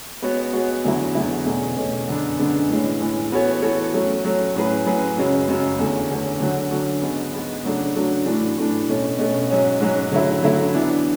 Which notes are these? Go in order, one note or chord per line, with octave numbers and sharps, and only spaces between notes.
G#3 B3 F#4 C#5
G#3 B3 F#4 C#5
E2 D3 F#3 B3 E4
E2 D3 F#3 B3 E4
E2 B2 A3 C#4
E2 B2 A3 C#4
F#2 D3 G#3 B3 D4
F#2 D3 G#3 B3 D4
A2 E3 G#3 C#4
A2 E3 G#3 C#4
E3 B3 F#4 A4 C#5
E3 B3 F#4 A4 C#5
F#3 A3 C#4
F#3 A3 C#4
A2 F#3 C#4 G#4 B4
A2 F#3 C#4 G#4 B4
F#2 C#3 G#3 C#4 F#4
F#2 C#3 G#3 C#4 F#4
E2 D3 A3 C#4
E2 D3 A3 C#4
D3 F#3 C#4 F#4
D3 F#3 C#4 F#4
G#2 G#3 B3
G#2 G#3 B3
C#3 F#3 A3 D4 F#4
C#3 F#3 A3 D4 F#4
A2 E3 A3 D4
A2 E3 A3 D4
B2 A3 C#4
B2 A3 C#4
G#2 F#3 C#4
G#2 F#3 C#4
D3 F#3 A3 E4
D3 F#3 A3 E4
E3 B3 D4